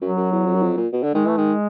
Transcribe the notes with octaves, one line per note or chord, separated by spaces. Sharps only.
F#2 F#3
F#2
E2
F2
F#2
F2
A#2
B2
D3
D#3 G#3
E3 A3
D#3 G#3